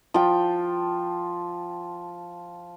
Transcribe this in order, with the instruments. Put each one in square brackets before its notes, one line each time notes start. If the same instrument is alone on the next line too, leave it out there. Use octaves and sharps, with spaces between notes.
[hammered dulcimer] F3 G5